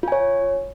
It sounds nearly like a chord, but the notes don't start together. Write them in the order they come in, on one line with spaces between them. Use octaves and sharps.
F4 G#5 C#5